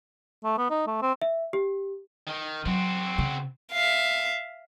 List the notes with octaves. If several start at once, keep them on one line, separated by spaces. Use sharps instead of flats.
A3
B3
D#4
A3
C4
E5
G4
D#3
F#3 C4 F#4
C#3
E5 F5